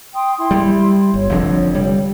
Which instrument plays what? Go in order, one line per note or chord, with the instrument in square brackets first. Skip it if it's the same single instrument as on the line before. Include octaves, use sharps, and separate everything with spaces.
[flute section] G5 C6 D#6
E4 C6
[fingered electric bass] G3
[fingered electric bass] G1 [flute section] C#5
[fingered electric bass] F1 F2 D3
G3